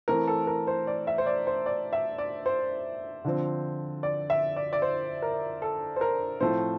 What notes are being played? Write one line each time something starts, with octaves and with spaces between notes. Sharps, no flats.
E3 A3 C4 A#4
A4
A#4
C5
D5
E5
C5
D5
C5
D5
E5
D5
C5
D3 F3 C4
D5
E5
D5
D5
C5
A#4
A4
C5
A#4
A2 F3 A3 C4 C5